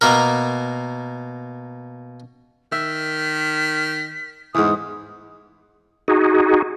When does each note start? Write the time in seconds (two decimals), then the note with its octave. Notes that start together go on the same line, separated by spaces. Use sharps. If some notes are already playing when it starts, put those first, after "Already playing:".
0.01 B2 A#3 A#4
2.72 D#3 E5 B6
4.55 E2 G#2 E3 D#6
6.08 D#4 F#4 G#4